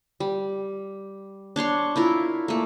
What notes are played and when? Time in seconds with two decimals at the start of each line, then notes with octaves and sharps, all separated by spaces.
0.20 G3
1.56 D4 C#5 C6 C#6
1.96 E4 F4 A#4
2.48 A3 A#3